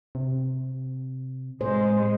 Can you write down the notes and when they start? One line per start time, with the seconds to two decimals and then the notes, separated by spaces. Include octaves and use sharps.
0.15 C3
1.61 A2 G#3 C5